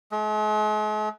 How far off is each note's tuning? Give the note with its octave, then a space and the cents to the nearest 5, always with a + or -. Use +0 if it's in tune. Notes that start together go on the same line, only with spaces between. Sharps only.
G#3 +45